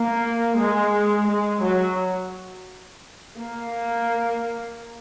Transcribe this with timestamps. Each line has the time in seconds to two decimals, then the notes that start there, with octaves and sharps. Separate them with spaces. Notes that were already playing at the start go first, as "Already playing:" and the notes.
Already playing: A#3
0.57 G#3
1.27 G#3
1.61 F#3
3.37 A#3